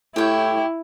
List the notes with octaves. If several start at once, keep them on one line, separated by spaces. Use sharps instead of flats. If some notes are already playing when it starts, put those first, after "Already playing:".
A2 E4 G4 C#5 G5